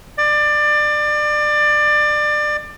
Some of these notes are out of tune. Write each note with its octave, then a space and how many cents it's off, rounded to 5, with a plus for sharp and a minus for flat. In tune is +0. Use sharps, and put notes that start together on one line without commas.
D5 +25